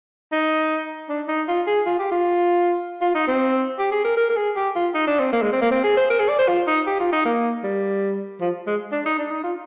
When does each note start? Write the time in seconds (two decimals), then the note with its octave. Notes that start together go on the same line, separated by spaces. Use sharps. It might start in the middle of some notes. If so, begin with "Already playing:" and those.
0.32 D#4
1.09 D4
1.28 D#4
1.48 F4
1.67 G#4
1.86 F4
1.99 G4
2.12 F4
3.01 F4
3.15 D#4
3.28 C4
3.79 G4
3.92 G#4
4.05 A#4
4.17 A#4
4.30 A#4
4.36 G#4
4.56 G4
4.76 F4
4.95 D#4
5.07 D4
5.20 C4
5.33 A#3
5.42 G#3
5.53 C4
5.61 A#3
5.71 C4
5.84 G#4
5.97 C5
6.10 A#4
6.20 G#4
6.29 D5
6.39 C5
6.48 F4
6.67 D#4
6.87 G4
7.00 F4
7.12 D#4
7.25 A#3
7.64 G3
8.41 F3
8.67 G#3
8.92 D4
9.06 D#4
9.19 D4
9.31 D#4
9.44 F4